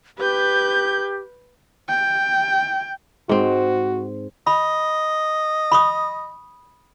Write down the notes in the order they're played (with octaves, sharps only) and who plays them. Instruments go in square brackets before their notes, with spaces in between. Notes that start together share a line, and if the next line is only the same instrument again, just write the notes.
[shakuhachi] G4 [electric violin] B4 G6
[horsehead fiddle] G5
[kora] G#2 C4 [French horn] F#4
[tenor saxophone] D#5 [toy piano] B5
[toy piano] B5 C#6 D#6